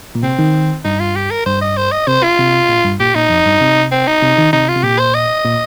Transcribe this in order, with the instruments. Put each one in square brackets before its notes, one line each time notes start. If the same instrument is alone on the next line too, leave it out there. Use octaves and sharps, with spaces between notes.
[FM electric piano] A#2
[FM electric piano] C3 [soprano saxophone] C4
[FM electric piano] D#3
[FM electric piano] G2 [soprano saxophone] D#4
[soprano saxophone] F4
G4
A#4
[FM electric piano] G2 [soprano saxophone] C5
[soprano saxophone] D#5
C5
D#5
[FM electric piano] C3 [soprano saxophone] C5
[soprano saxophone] F4
[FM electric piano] C3
A#2
G2
[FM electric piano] A#2 [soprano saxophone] G4
[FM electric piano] A#2 [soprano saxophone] D#4
[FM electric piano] F2
G2
C3
[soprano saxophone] C4
D#4
[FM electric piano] C3
D#3
[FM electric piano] C3 [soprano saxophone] D#4
[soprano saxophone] F4
[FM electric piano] C3
[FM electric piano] A#2 [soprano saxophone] G4
[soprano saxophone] C5
D#5
[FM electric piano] A#2